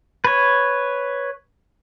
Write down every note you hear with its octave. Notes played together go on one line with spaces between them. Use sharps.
B4 C#5